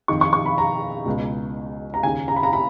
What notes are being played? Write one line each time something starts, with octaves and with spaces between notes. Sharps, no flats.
F2 D#3 C#6
C#6
C#6
B5
A#5
C#2 B2
A#5
D#2 C#3 G#5
A#5
B5
A#5
B5